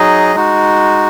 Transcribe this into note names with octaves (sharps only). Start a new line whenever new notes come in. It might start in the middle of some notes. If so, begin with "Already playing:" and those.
Already playing: F#3 D#4 G#4 D#5
G#3 D#4 F#4